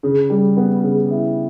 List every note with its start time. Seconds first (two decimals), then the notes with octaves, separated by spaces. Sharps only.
0.03 C#3
0.30 G3
0.57 B3
0.83 C#3
1.11 E4